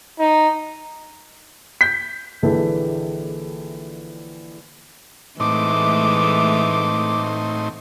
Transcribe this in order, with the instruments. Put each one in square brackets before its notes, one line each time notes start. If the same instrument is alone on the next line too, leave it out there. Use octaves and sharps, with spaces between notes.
[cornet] D#4
[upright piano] G6 B6
A#1 D3 E3 G#3 A4
[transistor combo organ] A2 C4 D#4 [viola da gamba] E3 G#3 A3 [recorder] D6